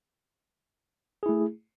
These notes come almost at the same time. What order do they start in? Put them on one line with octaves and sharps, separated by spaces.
G#4 E4 A3